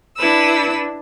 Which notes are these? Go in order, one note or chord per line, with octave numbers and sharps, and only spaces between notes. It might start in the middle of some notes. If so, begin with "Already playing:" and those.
D4 E4 B4 E6